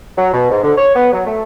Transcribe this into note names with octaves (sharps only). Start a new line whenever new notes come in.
F#3
B2
G#2
D3
C#5
B3
F#3
A3